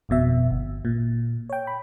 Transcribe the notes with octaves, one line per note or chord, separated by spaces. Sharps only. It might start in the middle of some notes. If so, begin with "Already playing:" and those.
G1 F2 B2 E5
G1
A#2
C#5 G5
B5